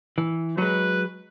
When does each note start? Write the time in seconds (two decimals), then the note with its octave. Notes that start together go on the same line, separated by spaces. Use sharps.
0.18 E3
0.58 F#3 G#3 B4